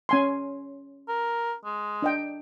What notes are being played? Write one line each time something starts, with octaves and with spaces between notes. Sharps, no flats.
C#4 G#5 C6
A#4
G#3
D4 D#5 G5